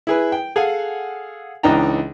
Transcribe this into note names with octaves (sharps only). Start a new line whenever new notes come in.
E4 G#4 B4
G5
G#4 A4 F5 F#5 G#5
C#2 E3 D4 D#4 G5 A#5